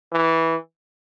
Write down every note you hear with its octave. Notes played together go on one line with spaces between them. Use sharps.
E3